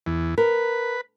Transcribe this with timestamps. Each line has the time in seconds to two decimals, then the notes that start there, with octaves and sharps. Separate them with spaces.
0.06 E2
0.38 A#4 B4